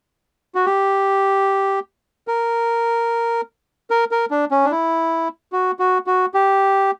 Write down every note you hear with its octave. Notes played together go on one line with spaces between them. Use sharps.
F#4
G4
A#4
A#4
A#4
D4
C#4
D4
E4
F#4
F#4
F#4
G4